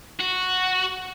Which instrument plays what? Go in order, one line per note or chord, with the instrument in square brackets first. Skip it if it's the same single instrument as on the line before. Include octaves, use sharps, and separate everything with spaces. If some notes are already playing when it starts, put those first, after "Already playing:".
[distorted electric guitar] F#4